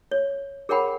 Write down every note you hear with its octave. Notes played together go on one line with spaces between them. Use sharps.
C#5
G#4 A#4 C#5 F#5 G5 B5